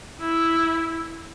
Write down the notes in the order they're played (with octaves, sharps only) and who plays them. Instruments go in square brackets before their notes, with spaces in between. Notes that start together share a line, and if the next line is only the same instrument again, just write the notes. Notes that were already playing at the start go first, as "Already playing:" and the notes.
[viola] E4